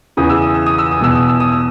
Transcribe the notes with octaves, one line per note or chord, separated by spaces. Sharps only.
E2 C#3 E3 D#6
E6
D#6
E6
D#6
E6
D#6
E2 B2 E6
D#6
E6
D#6
E6